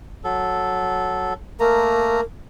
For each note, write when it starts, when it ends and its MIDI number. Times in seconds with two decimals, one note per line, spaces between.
0.24 1.33 54
0.24 1.33 69
1.60 2.21 57
1.60 2.21 58
1.60 2.23 70
1.60 2.21 82